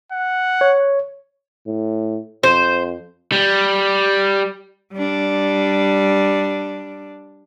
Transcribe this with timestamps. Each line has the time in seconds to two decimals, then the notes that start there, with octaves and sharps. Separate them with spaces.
0.12 F#5
0.61 C#5
1.67 A2
2.43 F2 C5
3.32 G3
4.93 G3 D4